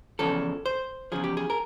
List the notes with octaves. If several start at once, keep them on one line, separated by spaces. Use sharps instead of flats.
E2 C#3 F3 A4
C5
E2 C#3 F3 G#4
G4
G#4
A#4